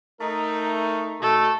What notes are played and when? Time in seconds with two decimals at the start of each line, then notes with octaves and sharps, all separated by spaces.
0.20 A3 D#4 A#4
1.22 B2 A3 A4